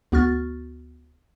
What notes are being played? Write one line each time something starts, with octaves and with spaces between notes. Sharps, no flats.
D2 B3 F#4 C#6 F6 A6